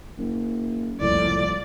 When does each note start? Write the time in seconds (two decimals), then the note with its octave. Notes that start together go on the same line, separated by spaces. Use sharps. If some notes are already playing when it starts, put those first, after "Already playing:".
0.18 F#1
1.01 F#1 C2 F2 A2 D5